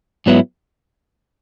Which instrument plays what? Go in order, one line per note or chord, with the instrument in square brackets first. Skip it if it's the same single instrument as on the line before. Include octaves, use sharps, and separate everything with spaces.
[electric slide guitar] G#2 F#3 B3 E4